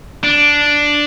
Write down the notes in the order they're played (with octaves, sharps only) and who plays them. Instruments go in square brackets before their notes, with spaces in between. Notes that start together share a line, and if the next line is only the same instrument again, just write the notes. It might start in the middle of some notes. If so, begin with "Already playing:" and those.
[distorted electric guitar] D4